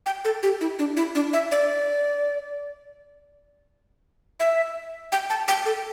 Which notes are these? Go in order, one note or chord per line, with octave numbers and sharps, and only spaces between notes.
G5
A4
G4
E4
D4
E4
D4
E5
D5
E5
G5
A5
G5
A4